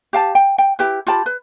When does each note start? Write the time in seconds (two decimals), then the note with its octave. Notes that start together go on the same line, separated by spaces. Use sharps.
0.13 G4 F5 A5
0.35 G5
0.58 G5
0.79 E4 G4 B4
1.07 F4 G4 A5 B5
1.26 B4